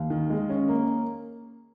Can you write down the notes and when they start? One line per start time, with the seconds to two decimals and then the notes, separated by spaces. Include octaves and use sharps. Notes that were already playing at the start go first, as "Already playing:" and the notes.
Already playing: D#2 F5
0.10 D#3
0.30 G#3
0.50 C#4
0.68 A#3